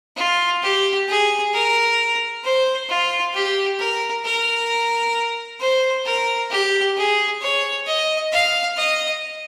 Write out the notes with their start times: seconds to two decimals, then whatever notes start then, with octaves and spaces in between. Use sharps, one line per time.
0.17 F4
0.62 G4
1.08 G#4
1.53 A#4
2.44 C5
2.89 F4
3.34 G4
3.79 A#4
4.25 A#4
5.60 C5
6.06 A#4
6.50 G4
6.97 G#4
7.42 C#5
7.86 D#5
8.32 F5
8.77 D#5